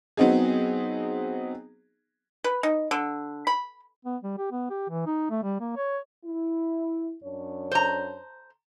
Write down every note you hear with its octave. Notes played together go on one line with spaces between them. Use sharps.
F#3 B3 C4 D#4 G#4
B4
D#4
D3
B5
B3
G3
G4
B3
G4
E3
D#4
A3
G3
A#3
C#5
E4
F#2 D4 C#5
C5 A#5